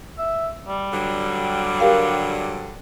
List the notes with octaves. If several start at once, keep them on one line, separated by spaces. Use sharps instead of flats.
E5
G3
G2 D3 F#3
G4 A#4 F5